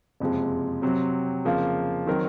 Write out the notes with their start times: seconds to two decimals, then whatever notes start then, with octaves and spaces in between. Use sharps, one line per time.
0.20 F#1 F2 C3 F3 G#3
0.82 C3 F#3 C4
1.45 F2 C#3 F3 A#3 F4
2.07 D#3 F#3 C4 D#4 A#4